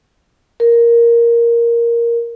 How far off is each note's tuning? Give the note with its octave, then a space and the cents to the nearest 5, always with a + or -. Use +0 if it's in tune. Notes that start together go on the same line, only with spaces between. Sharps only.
A#4 +5